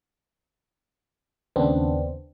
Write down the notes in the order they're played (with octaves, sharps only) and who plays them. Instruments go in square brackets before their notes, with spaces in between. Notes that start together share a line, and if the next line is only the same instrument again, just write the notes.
[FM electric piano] D#2 C#3 B3 C4 D4